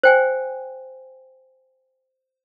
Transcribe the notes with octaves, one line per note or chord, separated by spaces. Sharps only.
C5 G5 G#5